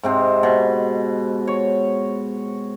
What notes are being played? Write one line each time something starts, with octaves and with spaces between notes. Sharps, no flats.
G#2 C3 C4
B2
C#5